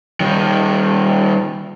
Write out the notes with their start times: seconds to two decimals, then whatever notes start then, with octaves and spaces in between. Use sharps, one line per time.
0.20 D#3 G3